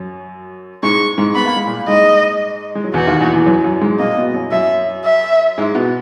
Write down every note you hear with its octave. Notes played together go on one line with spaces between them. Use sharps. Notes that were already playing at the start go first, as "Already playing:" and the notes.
Already playing: F#2 F#3
G#2 G#3 C#6
G#2 G#3
B3 B5
A#3
G#3
A#2 A#3
G#2 G#3 D#5
G#3
F#3
E2 E3 F#4
D#2 D#3
E2 E3
E2 E3
F#2 F#3
F#2 F#3
G#2 G#3
A#2 A#3 D#5
B2 B3
F#2 F#3
F#2 F#3 E5
E5
G#2 G#3
B2 B3